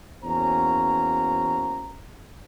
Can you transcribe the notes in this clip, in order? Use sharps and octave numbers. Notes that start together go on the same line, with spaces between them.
E2 A#3 C#4 F#4 C5 A#5